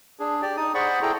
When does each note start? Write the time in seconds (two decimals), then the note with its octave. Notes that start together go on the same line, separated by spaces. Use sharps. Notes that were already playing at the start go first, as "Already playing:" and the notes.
0.19 D4 G#4
0.42 G4 D5
0.57 D#4 D#6
0.74 G#4 C5 D5 F#5 B5 C#6
1.02 E4 G#4 A4 G5 A#5